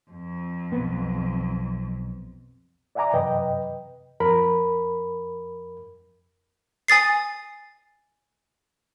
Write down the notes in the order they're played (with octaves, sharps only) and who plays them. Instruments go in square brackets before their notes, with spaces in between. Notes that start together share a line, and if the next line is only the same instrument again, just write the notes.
[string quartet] F2
[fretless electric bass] B1 B3
[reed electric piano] D5 E5 F#5 G#5 A#5 D6
F#2 C3 B4 D#5 G5
F2 A#4 B5
[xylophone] G#5 D#6 A6 C7